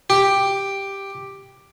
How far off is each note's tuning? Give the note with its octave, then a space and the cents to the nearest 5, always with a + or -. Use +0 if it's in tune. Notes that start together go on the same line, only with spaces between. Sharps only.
G4 +5